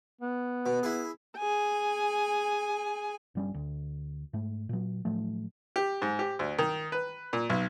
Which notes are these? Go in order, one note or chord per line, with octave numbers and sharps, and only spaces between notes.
B3
B2
E4 G#4
G#4 G#5
G1 G3 C#4
D2
G#2 A3
A#2 F#3
A2 F3 F#3 A3
G4
G#2
G4
D2
D#3
B4
A#2
B1